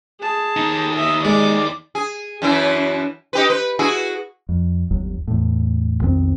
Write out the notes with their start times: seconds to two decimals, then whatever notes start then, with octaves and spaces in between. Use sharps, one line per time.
0.20 G#4 A5
0.56 D#2 D#4
0.94 D#5 E5
1.25 G#3 D5 D6
1.95 G#4
2.42 F#2 E3 E4
3.33 D#4 G4 B4
3.50 B4
3.79 E4 F#4 G#4
4.49 F2
4.91 G1 D#2 F#3
5.27 E2 A2
6.01 B1 F2 D#3 C4